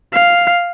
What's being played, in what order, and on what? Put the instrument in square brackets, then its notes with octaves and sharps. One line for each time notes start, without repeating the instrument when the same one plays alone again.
[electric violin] F5